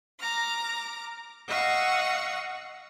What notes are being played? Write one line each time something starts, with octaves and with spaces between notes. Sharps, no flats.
A#5 D6 F6
D#5 F5 F#5 C#6 E6